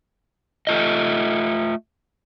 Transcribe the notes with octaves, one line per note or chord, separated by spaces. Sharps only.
A3 F4 D#5